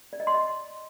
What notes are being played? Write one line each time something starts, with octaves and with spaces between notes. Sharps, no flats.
D5
D#5
C6
D#5